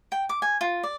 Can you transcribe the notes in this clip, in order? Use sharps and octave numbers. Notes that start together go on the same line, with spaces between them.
G5
D6
G#5
F4
D5